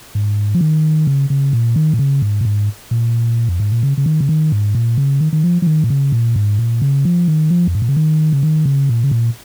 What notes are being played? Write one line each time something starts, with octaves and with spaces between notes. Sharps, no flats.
G#2
F3
D#3
C#3
C#3
A#2
D#3
A#2
C#3
G#2
A#2
G#2
A#2
F2
G#2
A#2
C#3
C#3
D#3
C#3
D#3
G#2
A#2
C#3
D#3
D#3
F3
F3
D#3
A#2
C#3
A#2
G#2
A#2
C#3
F3
D#3
F3
F2
G#2
A#2
C#3
D#3
C#3
D#3
C#3
A#2
C#3
A#2